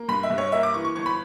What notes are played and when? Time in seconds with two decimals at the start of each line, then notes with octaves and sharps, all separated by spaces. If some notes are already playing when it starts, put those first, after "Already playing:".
Already playing: A#3
0.08 G2 B5
0.23 E5
0.30 G2
0.38 C#5
0.52 A#3 E5
0.63 D6
0.74 E3 C#6
0.85 C#6
0.96 G1 C#6
1.06 B5